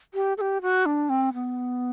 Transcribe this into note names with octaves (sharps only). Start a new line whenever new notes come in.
G4
A4
G4
F#4
D4
C4
B3